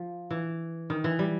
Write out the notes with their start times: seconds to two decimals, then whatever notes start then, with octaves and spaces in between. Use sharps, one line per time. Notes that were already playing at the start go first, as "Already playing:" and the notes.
Already playing: F3
0.30 E3
0.90 D#3
1.04 E3
1.19 G3